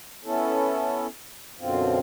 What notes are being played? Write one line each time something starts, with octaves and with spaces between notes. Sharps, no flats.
B3 C#4 E4 A4
F#2 B2 D3 C4 F4